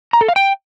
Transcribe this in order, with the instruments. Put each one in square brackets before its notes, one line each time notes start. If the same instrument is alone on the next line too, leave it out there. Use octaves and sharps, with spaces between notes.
[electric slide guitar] A#5
A4
F5
G5